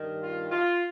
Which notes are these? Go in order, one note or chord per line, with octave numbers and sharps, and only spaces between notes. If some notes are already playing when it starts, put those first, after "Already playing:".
Already playing: G2 D#3
F4
F4